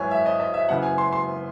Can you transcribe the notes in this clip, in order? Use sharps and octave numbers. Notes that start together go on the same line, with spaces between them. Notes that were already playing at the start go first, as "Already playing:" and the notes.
Already playing: G#1 F#2 E3 C#5 G#5
E5
D#5
D#5
E5
F#1 F#2 C#3 E3 F#5
G#5
C6
C6